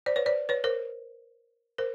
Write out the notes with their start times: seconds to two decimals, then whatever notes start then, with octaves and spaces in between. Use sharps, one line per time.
0.06 C5 D5
0.16 B4 C#5
0.26 C5 D5
0.49 B4 C#5
0.64 A#4 C5
1.78 A#4 C5